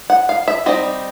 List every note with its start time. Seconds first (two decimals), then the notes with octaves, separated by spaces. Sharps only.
0.10 F#5
0.29 F5
0.48 E5
0.66 G3 C4 D#4 D#5